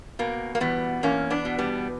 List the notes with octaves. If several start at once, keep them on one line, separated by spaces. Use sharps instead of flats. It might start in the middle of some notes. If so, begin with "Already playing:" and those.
B2 A#3
A#3
E2 G3 B3
E2 A#3 C#4
B3 D4
B2
G3 B3